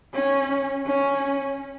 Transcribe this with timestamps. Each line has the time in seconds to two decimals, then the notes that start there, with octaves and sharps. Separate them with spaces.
0.14 C#4
0.86 C#4